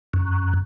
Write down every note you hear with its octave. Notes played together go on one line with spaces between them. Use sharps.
F#2